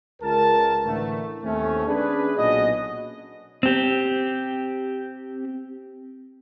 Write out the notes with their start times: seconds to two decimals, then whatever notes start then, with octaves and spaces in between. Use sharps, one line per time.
0.22 C#2 A#4 A5
0.84 A2 D3 E3 A3
1.43 D#2 A3 C4 C#4
1.87 C#4 D4 G#4 B4
2.37 B1 A#2 C#4 F#4 D#5
3.63 C4 G4